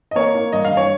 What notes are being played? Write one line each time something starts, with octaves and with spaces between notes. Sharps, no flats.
D#5
A#3 C#5
A#3
G2 D#5
F5
G2
C#5